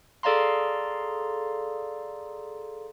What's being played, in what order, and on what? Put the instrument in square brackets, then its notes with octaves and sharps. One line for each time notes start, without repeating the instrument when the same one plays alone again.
[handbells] G#4 A4 D5 F5 A#5 C6